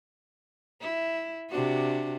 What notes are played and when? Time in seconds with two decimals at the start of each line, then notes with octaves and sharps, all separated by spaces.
0.81 E4
1.50 C3 D4 F#4